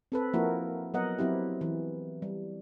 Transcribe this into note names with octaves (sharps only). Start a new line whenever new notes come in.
C4 A4 B4
F3 A#3 E4 F#4 A#4
F#3 B3 A#4 D#5 F#5
F#3 C4 E4 G4
E3
G3